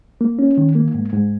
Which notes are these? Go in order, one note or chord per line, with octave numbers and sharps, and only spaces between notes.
A#3
C#4
D#3
A#3
G#2
G#2